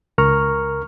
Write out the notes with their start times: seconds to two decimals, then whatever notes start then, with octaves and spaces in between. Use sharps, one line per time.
0.18 C#2 A#4 A#5 C#6 F6